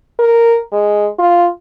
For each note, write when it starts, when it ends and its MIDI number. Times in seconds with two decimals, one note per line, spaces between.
0.19 0.60 70
0.73 1.08 56
1.19 1.48 65